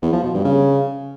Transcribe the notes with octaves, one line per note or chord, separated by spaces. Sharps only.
E2
F3
B2
G2
C#3